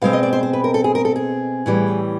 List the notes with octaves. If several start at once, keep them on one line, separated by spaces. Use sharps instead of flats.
B2 G#3 C4 F5
D#5
D5
C5
C5
B4
A#4
A4
G#4
A#4
A4
G#4
A2 E3 G3